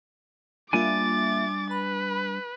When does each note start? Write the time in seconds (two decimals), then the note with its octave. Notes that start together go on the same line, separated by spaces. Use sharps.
0.73 G3 A#3 D4 F4 E5 G#5 D6 A6
1.71 B4 B5